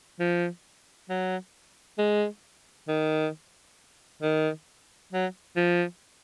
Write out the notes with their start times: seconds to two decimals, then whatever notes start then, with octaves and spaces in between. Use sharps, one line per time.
0.20 F3
1.09 F#3
1.98 G#3
2.88 D#3
4.22 D#3
5.13 F#3
5.57 F3